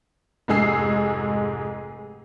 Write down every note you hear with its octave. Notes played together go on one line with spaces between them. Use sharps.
F1 G#2 G#3 G#4 E6 C7